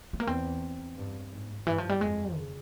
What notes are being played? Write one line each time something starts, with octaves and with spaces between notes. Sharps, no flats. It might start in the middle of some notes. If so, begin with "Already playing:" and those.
G#3
A#3
E2 C4
G2
G#2
C#3
G2 E3
F3
G3
F2 G#3
C#3